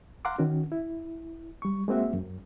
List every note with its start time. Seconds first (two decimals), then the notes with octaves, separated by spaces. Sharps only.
0.25 F5 F#5 A#5 C6 D6
0.38 D#3 C#4 F#4
0.72 E4
1.62 G3 C#6
1.88 G#3 A#3 C4 F#4 E5
2.14 F#2